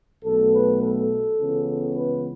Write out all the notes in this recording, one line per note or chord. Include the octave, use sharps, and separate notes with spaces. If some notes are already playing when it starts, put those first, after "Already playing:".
B1 B2 A3 A4
B4
A4
C#2 C#3 E3 B3
B4